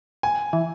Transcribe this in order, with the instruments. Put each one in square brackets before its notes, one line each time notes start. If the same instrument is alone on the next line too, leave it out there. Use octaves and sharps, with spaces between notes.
[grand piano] G#5
[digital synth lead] E3